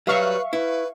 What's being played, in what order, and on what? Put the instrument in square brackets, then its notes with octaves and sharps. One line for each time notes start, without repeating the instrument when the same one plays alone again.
[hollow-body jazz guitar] F#3 G3 [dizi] B4 [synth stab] E5 F5 C#6
[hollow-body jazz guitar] E4 [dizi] B4